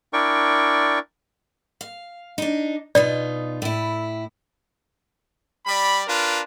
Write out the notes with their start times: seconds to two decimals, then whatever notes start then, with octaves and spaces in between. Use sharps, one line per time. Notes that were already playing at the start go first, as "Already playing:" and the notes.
0.13 D4 E4 A#4 D5 G5 C#6
1.81 F5
2.38 D4 D#4
2.95 B2 D#4 F4 D5
3.62 A2 E4
5.66 G3 D5 B5
6.08 D4 F4 A#4 B4